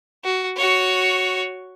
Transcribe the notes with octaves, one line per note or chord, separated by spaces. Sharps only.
F#4
F#4 C#5